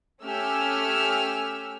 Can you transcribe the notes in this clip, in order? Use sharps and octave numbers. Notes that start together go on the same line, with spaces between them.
A3 C#4 G4 G#5 E6 F6